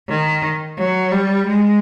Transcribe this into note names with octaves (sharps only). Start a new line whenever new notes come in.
D#3
F#3
G3
G#3